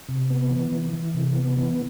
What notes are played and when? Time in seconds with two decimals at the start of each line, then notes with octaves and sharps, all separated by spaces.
0.09 C3
0.30 B3
0.51 E3
0.72 E3
0.93 E3
1.14 C3
1.35 B3
1.57 E3